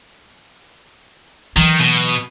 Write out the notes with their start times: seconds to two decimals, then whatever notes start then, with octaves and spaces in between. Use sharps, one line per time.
1.57 D#3 E3 F#3
1.80 B2